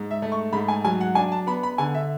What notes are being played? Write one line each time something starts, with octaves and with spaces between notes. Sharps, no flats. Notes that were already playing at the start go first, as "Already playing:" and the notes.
Already playing: G#2
E5
A3
C#6
G#2 B5
G#5
F#3 G#5
F#5
D4 G#5
A5
B3 B5
B5
D3 G#5
E5